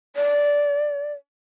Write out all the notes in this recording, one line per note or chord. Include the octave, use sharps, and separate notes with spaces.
D5